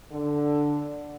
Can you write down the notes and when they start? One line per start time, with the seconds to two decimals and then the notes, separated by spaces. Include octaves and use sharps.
0.11 D3